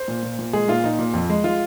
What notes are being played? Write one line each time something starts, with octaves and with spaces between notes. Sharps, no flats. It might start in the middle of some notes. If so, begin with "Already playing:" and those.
Already playing: C5
A#2
A#2
A#2
G#3 G#4
A#2 F4
A#2 D#4
A#2
F2
G#3
G#3 F4